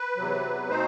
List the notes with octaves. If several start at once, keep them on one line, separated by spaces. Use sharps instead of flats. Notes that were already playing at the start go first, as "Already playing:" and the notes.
Already playing: B4
E2 C3 F#3
B2 A3 C4 D#4 C5